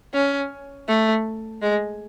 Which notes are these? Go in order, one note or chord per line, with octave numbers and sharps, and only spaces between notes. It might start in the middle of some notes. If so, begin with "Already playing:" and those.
C#4
A3
G#3